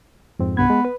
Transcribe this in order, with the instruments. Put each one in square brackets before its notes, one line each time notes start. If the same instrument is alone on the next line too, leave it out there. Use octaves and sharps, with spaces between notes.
[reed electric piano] F2 G#2 C4
[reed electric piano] C2 G2 G#6 [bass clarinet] B3
[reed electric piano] G#3
B4